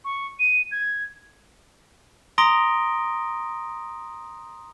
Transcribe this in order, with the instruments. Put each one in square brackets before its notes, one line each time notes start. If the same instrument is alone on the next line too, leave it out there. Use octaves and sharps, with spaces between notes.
[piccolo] C#6
D#7
G#6
[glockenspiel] A#5 C6 D#6 A#6 D7 G7